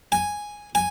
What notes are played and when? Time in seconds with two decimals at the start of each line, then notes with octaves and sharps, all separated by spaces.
0.12 G#5
0.75 G#5